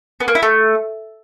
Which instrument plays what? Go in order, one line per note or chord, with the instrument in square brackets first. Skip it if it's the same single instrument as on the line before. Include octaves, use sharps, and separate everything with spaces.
[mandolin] B3
A#3
E4
A3